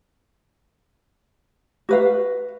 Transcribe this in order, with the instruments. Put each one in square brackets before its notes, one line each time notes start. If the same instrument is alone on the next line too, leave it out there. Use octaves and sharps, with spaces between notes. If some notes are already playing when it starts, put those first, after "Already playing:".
[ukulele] F#4 B4 F5